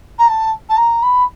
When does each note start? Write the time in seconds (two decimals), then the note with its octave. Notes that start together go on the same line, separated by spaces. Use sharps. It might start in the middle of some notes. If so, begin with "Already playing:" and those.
0.18 A#5
0.27 A5
0.69 A5
0.76 A#5
1.02 B5